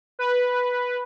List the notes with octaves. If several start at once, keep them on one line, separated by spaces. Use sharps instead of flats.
B4